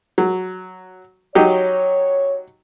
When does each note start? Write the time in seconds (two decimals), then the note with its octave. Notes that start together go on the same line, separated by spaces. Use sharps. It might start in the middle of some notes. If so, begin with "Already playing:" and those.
0.18 F#3
1.35 F#3 D#4 G4 C#5